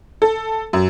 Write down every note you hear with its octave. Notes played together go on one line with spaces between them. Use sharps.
A4
F#2